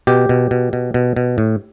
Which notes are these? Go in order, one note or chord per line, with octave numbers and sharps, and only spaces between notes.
B2 G4
B2
B2
B2
B2
B2
A2